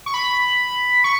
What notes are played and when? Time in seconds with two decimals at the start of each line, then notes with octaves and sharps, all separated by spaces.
0.06 C#6
0.14 B5
1.04 C#6